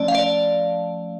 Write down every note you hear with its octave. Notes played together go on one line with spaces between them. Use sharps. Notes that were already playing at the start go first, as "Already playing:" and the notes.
Already playing: F3 A3 C#4 D5 A5
F5
D5